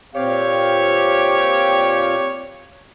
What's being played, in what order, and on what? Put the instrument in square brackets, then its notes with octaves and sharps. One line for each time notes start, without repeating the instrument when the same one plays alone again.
[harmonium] A#2 C4 F5 [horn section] G4 C#5